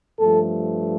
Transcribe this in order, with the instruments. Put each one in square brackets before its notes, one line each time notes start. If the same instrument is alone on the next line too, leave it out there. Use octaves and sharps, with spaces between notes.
[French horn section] G2 F3 A3 A4